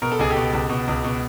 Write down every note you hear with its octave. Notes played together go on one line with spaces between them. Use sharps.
B2 A#4
A4
C#2 G#4
G4 A4
B2
C#2
B2
C#2
B2